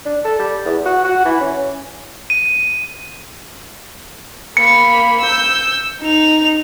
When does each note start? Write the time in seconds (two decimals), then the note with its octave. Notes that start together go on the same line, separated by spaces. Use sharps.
0.06 D4
0.25 A4
0.39 G3
0.65 E2
0.86 F#4
1.05 F#4
1.25 E3
1.41 C#4
2.30 D#7
4.57 A#3 B5 C#7
5.21 E6 G6
6.02 D#4 F7